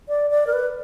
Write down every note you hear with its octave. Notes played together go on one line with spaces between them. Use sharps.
D5
D5
A#4
B4